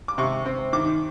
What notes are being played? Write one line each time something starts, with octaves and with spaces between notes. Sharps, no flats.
D6
C3 C#6
C4
D#3 D6